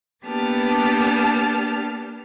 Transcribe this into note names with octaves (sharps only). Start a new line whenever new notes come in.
A#3 B3 D4 G4 A5 F6